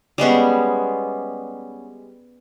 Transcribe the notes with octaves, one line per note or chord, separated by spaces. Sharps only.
G3 G#3 B3 C#4